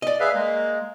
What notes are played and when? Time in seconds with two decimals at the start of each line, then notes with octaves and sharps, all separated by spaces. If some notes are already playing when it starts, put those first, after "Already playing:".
0.02 D5 D#5
0.20 G#4 B4 E5 F5
0.35 G#3 A#3